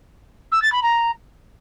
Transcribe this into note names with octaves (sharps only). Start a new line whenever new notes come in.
E6
A6
B5
A#5